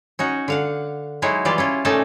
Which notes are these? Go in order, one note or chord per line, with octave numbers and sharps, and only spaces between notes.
C#4 D#4 F#4
D3 F5 F#5
F#3 G#3 D#4 E4 C#5
E3 G3 F4 G4 D5
C#4 E4 F4
A#2 A3 C#4 D#4 D5 A5